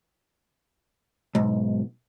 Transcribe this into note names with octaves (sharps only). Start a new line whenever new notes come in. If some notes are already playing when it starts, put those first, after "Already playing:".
B1 G#2